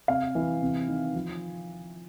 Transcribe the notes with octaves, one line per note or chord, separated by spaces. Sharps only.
C3 F5
E3
C3
D#3
F3